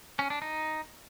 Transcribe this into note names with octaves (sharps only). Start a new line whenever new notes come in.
C#4
D4
D#4